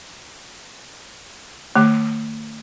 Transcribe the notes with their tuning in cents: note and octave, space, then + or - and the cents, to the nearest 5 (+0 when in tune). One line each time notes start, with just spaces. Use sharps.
D#3 -45 A3 +30